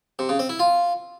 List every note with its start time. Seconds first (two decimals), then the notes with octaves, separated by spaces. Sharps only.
0.19 C3
0.29 C#3
0.39 C4
0.49 E4
0.59 F4